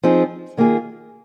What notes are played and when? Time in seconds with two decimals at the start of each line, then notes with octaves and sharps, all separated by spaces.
0.03 F3 C4 D#4 G#4
0.57 D#3 A#3 F4 G#4